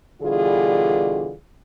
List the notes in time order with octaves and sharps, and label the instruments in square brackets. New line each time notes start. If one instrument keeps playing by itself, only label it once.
[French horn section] B2 D3 E3 G3 F4 G#4